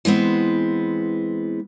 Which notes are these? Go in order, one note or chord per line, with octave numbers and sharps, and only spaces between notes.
E3 G#3 B3 C4